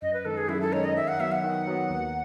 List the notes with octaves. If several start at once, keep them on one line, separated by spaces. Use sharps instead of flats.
F#2 D#5
B4
D#3 G#3 D#4 A4
G#4
F#2 E4
A4
D#3 G#3 D#4 C#5
D#5
D#3 E5
F#5
F#3 B3 E5
F#5
D#3
F#3 B3
D#2